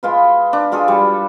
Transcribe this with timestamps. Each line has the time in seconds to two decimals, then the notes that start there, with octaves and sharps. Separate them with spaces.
0.03 G#3 F4 B4
0.53 D4
0.72 G#3 F4 G#4 A4
0.88 G3